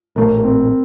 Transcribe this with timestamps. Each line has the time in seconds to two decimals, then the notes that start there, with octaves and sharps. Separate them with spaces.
0.16 A#1 A2 A3 A#3
0.43 C4